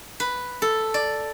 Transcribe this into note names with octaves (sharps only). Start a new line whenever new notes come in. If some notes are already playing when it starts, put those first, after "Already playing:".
B4
A4
D5